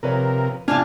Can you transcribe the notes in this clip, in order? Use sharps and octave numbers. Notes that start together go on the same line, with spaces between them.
C3 F3 A#4 B4 C#5
A#1 E2 C3 D4 F4 G#5 A5 F6